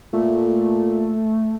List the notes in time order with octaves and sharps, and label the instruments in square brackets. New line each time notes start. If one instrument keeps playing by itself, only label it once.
[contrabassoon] A#2 [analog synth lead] A3